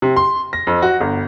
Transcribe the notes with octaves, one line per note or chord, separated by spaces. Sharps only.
C3
C6
A#6
F2
F#4
G1